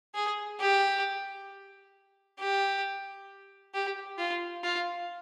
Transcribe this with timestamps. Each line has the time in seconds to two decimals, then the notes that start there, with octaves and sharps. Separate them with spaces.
0.15 G#4
0.60 G4
2.39 G4
3.74 G4
4.19 F4
4.64 F4